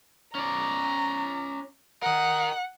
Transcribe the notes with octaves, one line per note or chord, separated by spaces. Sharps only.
C#4 D5 A#5
A#4 D#5 F#5